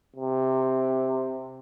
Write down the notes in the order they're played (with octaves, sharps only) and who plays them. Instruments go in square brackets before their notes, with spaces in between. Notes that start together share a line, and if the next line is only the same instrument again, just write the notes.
[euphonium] C3